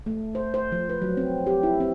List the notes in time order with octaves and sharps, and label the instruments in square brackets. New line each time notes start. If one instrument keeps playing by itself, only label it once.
[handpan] A3
C5
C5
F3
B4
F#3
C4
G4
E4
C4